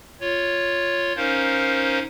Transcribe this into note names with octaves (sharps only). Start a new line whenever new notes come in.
F4 C#5
C#4 D#4 A#4 C5 F5